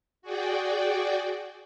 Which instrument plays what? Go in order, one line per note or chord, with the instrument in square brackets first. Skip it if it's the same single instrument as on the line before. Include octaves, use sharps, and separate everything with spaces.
[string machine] F#4 G#4 D5 G5